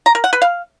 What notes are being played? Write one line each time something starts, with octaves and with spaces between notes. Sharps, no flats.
A#5
A#4
F#5
B4
F5